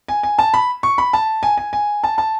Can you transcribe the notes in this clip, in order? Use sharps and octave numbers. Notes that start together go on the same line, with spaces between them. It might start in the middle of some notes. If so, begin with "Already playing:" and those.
G#5
G#5
A5
B5
C#6
B5
A5
G#5
G#5
G#5
A5
A5